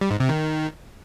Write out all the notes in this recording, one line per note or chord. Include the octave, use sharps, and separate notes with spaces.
G3
G#2
C3
D#3